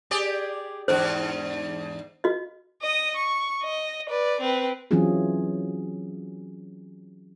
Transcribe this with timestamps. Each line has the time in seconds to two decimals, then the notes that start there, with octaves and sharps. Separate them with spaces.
0.11 G4 G#4 D5
0.88 E2 G#2 D4 C5
2.24 F#4 D#5
2.82 D#5 D#6
3.16 C#6
3.63 D#5
4.09 B4 D5
4.40 C4 B4
4.91 E3 F#3 C4 C#4 F4 G#4